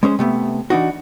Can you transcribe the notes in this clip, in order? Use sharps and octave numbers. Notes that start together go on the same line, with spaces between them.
G#3 C#4 G#4 C5
C3 A3 B3
E3 D4 D#4 F#4